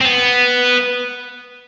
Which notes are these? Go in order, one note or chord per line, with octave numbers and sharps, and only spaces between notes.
C4
B3